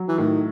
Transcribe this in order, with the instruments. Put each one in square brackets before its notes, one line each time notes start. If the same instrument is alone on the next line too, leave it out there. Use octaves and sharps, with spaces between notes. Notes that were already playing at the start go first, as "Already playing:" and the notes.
Already playing: [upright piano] F#3
[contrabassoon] E3
[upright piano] A2 [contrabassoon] D#3